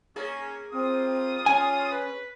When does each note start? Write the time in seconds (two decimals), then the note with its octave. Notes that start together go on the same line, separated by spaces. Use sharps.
0.16 A#3 C#4 G#4
0.73 G3 C4 F4 D#6
1.46 C#4 G#5
1.91 B4